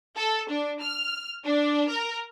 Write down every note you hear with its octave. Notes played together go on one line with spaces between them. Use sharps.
A4
D4
F6
D4
A#4